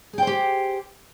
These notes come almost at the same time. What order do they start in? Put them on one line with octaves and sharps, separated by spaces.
G#4 G5 C5 G4